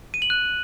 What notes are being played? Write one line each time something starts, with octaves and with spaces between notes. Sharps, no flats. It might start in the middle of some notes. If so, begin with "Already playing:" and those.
D#7
F#7
F#6